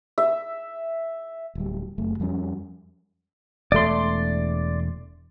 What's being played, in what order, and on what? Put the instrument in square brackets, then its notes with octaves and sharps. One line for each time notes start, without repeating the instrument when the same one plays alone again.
[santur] E5
[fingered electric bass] D1 G3
F#1 A3
F2 F3 G3 C#4
[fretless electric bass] E1 A3 [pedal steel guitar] D5 C6